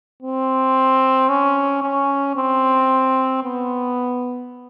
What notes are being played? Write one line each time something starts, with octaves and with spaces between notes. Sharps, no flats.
C4
C#4
C#4
C4
B3